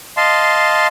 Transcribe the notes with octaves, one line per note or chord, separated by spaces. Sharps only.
D#5 F5 A5 C6